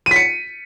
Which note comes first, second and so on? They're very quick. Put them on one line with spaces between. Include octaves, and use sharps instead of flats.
D#7 B6 C#7